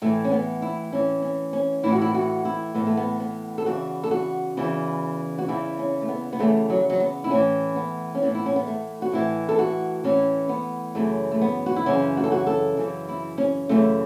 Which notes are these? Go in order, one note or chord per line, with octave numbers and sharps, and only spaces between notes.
A2 E3 A3
C#4
B3
E4
A2 E3 C#4
C#4
C#4
A2 E3 E4
F#4
E4
F#4
E4
A2 E3 B3
A3
B3
B3
A4
E2 C#3 E3 F#4
A4
F#4
E2 C#3 E3
F#4
E2 C#3 E3 E4
C#4
A3
B3
B3
E2 C#3 E3 A3
F#3
F#3
B3
E4
A2 E3 C#4
B3
C#4
A2 E3 B3
E4
C#4
B3
A3
F#4
A2 E3 E4
A4
F#4
A2 E3 C#4
B3
F#2 C#3 E3 A3
A3
B3
F#4
E4
F#2 C#3 E3 C#4
F#4
A4
F#4
A4
F#2 C#3 E3
E4
C#4
F#2 C#3 E3 A3